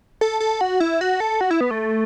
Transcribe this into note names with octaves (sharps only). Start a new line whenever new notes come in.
A4
A4
F#4
E4
F#4
A4
F#4
E4
B3
A3